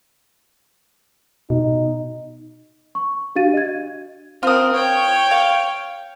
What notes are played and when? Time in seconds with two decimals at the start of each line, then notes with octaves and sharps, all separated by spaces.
1.50 B2 D#4
2.95 C#6
3.36 D4 F#4 G4 F5 A6 D#7
3.54 D#5 G#6
4.43 C4 F4 A#4 D#6
4.74 C#5 G5
5.31 F5